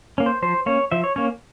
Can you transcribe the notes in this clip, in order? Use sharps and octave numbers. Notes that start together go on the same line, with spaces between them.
A#3 C#4
C5
F3 C5
A#3 C#4 C#5
F3 E5
C#5
A#3 C#4 C#5